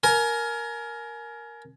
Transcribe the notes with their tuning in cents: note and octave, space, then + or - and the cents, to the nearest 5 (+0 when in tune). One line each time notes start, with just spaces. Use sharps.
A#4 +0 G#5 +30